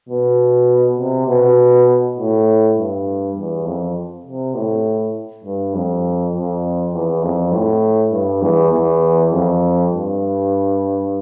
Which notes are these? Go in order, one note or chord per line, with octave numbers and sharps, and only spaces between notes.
B2
C3
B2
A2
G2
E2
F2
C3
A2
G2
F2
F2
E2
F2
A2
G2
E2
E2
F2
G2